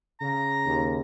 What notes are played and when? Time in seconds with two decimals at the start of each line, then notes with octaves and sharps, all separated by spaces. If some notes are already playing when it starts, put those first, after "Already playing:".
0.20 C#3 A#5
0.66 D#2